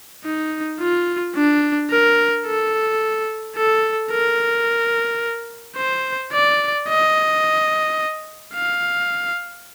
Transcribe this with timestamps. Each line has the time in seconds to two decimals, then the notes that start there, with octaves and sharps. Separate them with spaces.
0.25 D#4
0.80 F4
1.35 D4
1.91 A#4
2.46 A4
3.55 A4
4.11 A#4
5.77 C5
6.32 D5
6.88 D#5
8.54 F5